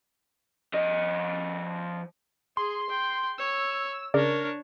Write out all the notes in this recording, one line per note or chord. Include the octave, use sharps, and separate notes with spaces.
F3 D#5
G#4 C6
G5
C#5 E6
C#3 D4 A#4 C#5 D5